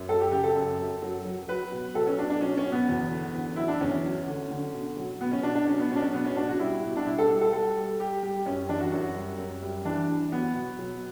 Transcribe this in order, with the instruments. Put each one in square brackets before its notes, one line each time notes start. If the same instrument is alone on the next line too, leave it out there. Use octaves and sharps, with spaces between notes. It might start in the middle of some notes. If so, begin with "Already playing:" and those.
Already playing: [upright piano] F#2
F#3 A4
G4
C#3 G4
A4
F#2
F#2
F#3
F#3
F#3 B4
B2
F#3 A4
C#4
B2 D4
D4
F#3 C#4
C#4
B2
B3
E2
D3
E2
F#3 E4
D4
E2 C#4
F#3
D3
D3
B2
F#3
B2 B3
C#4
B2 D4
D4
F#3 C#4
B3
B2 C#4
D4
C#4
F#3 B3
C#4
B2 D4
F#4
G3 E4
B2
D4
G3 E4
A4
G3
A4
G3 A4
G3
G3 G4
G3 G4
F#2 C#4
E3 D4
F#4
F#2 F#4
G3
F#2
G3
E3 D4
E3
F#3 B3
B2
F#3